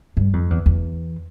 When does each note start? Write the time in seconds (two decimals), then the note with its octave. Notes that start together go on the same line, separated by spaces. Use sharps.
0.17 G2
0.33 F2
0.50 E2
0.66 E2